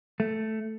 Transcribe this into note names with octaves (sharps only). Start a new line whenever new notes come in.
A3